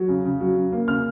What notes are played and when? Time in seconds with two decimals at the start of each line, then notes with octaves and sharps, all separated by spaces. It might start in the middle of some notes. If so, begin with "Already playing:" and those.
Already playing: F#3
0.08 C#3
0.25 C#3
0.40 F#3
0.57 C#3
0.72 A#3
0.88 C#3 F6